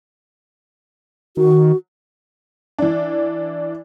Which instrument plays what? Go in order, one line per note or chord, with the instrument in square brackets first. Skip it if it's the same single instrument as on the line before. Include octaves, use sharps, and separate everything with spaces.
[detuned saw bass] D#3 [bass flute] F#4
[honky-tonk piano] E3 D4